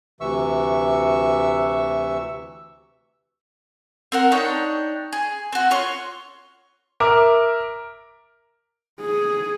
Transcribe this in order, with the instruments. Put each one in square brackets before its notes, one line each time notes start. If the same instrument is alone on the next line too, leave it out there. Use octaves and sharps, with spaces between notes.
[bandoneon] D2 C3 E3 E5 C#6 E6
[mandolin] C4 A#4 F#5
D4 D#4 C#5 G5
G#4
C4 F#4
F4 C#5 C6 C#6
[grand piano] A#4 E5 D6
[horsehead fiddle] G#4